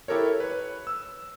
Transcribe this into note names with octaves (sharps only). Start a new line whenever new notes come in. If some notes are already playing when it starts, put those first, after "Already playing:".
E4 G4 A4 A#4 C#5
B4 C#5
E6